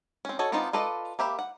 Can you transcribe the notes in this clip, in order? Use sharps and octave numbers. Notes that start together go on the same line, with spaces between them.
C4 C#4
F#4 A4 C#5 D#5
B3 C4 D4 D#4 F4
F4 A4 B4 D5 D#5
A#3 G4 E5 B5
F#5